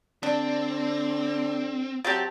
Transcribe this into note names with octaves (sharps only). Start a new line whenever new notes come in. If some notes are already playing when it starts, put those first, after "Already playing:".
D3 C4 D4
C3 F#3 C4 G4 A5